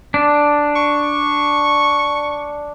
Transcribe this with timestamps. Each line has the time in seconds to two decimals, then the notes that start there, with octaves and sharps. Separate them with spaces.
0.14 D4
0.76 C#6